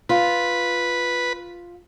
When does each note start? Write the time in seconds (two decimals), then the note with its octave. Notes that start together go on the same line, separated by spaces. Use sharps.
0.09 F4 B4